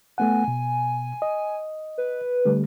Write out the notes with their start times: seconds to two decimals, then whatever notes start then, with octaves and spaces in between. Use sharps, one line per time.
0.18 A3 B3 F#5 G#5
0.48 B2
1.22 D#5
1.98 B4
2.46 D3 G3 A3